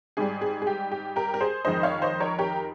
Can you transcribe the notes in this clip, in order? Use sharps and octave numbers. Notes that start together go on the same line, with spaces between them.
G#2 G3 G#4
G#4
G#4
G4
G4
G4 A#4
A#4
G#4 C5
F2 D#3 G#3 C5 D#5
C#5 F5
C5 D#5
A#4 C#5
G4 A#4